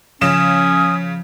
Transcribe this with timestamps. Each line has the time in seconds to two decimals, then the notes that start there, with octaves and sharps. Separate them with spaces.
0.21 C#3 F3 C#4 D#6 E7